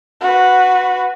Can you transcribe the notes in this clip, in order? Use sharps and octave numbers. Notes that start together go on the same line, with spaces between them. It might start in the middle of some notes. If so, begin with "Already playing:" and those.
F#4 B4